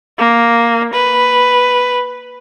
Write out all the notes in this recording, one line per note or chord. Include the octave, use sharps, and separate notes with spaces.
A#3
B4